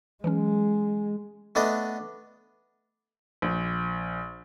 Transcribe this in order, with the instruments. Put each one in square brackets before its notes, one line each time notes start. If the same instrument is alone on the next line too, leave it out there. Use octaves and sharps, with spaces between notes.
[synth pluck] E3 F#3 C#4 [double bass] G#3
[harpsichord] A3 B3 D4 D5 D#5
[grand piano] A#1